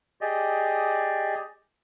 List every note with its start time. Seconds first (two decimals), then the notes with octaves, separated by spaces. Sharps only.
0.21 G4 G#4 D5 D#5